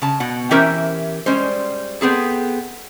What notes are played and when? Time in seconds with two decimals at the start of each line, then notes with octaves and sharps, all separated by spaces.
0.02 C#3 A5
0.20 B2 F#5
0.51 E3 C#4 G4 A#4 C5 E5
1.26 G3 G#3 C#4 C5
2.01 B3 C4 G#4 A4